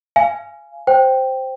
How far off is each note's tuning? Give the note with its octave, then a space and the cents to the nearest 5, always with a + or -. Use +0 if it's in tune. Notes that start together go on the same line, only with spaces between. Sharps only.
F5 -25 G#5 +5
C5 +0 G5 +0